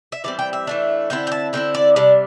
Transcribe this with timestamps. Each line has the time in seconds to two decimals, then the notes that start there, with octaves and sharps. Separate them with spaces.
0.12 E5
0.24 E3 G3 C4 D5
0.39 G5
0.53 E5
0.67 E3 A3 D4
1.10 D3 C4 E4 G5
1.27 G5
1.32 A5
1.53 D3 C4 E4 G5
1.74 D5
1.96 C3 G3 D4 D5